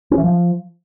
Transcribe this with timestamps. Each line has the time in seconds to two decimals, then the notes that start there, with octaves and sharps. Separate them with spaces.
0.11 C#4
0.18 E3
0.24 F3